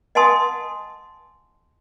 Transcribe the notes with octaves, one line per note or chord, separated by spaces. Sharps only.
D#5 F#5 G#5 A5 C6 D#6